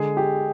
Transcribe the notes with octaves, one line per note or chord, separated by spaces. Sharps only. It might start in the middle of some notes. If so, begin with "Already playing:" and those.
Already playing: D3 G#3 G#4
G4